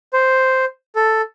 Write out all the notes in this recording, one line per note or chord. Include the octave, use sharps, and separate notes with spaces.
C5
A4